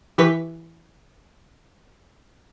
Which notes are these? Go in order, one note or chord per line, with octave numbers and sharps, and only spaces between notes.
E3 G4 B4 C#6 B6